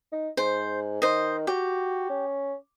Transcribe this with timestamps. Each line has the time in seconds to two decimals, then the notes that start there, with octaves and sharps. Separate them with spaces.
0.12 D#4
0.37 G#2 C5
1.02 D#3 C5 D#5
1.47 F#4 G4
2.09 C#4